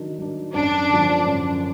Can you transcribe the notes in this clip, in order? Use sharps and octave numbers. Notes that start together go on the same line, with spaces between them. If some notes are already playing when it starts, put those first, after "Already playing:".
Already playing: D#3 F#3 D4
F#3 D4
F#2 D4
D3 F3
F#2